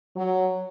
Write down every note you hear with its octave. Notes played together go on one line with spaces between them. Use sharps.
F#3